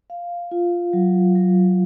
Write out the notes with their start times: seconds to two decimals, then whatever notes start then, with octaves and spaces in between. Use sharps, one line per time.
0.10 F5
0.51 F4
0.93 F#3
1.35 F#3